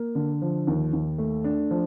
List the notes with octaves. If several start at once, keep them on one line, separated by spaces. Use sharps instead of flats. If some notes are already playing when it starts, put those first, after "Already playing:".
Already playing: A#3
D3
F3
D#2
D#2
A3
D4
F3